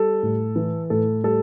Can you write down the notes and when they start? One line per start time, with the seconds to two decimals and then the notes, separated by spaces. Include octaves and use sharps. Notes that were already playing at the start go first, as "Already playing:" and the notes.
Already playing: G3 A4
0.23 A2
0.56 E3
0.90 A2 A4
1.24 G3 A4